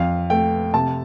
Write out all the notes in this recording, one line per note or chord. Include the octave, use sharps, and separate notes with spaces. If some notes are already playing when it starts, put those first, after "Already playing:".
Already playing: F2 F5
A3 G5
C3 A5